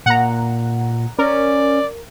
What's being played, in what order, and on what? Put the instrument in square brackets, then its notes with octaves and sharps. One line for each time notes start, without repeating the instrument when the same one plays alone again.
[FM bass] A#2 [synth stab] F#5 A#5
[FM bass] C#4 [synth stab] A#4 [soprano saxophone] D5